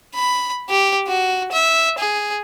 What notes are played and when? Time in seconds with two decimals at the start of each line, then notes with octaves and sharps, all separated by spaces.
0.15 B5
0.69 G4
1.08 F#4
1.52 E5
1.99 G#4